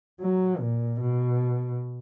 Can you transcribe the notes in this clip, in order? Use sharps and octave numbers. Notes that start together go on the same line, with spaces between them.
F#3
A#2
B2